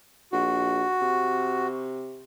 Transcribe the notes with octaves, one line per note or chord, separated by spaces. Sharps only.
A#1 F#4
C3